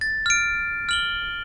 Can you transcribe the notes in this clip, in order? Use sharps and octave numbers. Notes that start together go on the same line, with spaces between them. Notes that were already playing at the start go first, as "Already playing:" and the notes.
A6
F6 D7
F6 F#7 G7